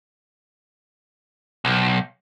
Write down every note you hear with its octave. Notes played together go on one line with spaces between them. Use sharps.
B1